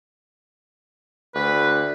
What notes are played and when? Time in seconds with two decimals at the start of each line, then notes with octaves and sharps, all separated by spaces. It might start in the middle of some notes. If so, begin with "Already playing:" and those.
1.35 D2 B4